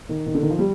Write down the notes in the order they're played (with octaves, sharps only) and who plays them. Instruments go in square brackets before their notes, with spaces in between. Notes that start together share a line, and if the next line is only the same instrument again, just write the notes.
[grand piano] D#3
D#3
D3
D#3
F3
G3